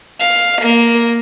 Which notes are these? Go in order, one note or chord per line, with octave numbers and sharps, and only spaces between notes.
F5
A#3